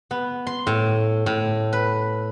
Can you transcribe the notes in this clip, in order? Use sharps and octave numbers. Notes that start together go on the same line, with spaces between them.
B3
C6
A2
A2
B4